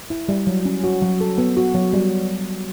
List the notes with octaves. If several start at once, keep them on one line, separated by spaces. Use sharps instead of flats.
E4
G3
F#3
C#4
F#4
F#3
A4
B3
F#4
F#3
G3